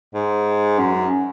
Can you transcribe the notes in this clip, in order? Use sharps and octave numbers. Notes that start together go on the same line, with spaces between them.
G#2
F#2